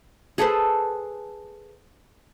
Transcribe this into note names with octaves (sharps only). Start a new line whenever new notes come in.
G#4 A4 B4 C5